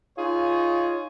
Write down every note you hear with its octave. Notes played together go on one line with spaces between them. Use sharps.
D#4 F4 G#4 C#5